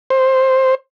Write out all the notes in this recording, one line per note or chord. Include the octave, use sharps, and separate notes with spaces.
C5